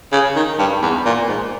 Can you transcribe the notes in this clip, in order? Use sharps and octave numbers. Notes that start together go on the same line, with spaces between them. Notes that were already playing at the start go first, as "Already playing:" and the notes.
C#3
D#3
G2
E2
A#2
G#2